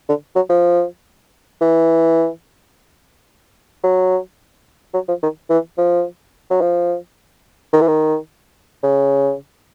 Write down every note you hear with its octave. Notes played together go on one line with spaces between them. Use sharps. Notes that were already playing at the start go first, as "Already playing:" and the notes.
D3
F#3
F3
E3
F#3
F#3
F3
D#3
E3
F3
F#3
F3
D#3
E3
D#3
C#3